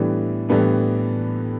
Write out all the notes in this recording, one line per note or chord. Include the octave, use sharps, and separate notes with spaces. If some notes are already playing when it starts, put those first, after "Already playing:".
Already playing: A2 E3 G3 B3 D4
A2 E3 G3 B3 D4